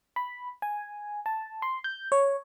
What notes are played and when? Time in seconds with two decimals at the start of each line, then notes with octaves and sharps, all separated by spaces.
0.16 B5
0.62 G#5
1.26 A5
1.62 C6
1.84 G6
2.12 C#5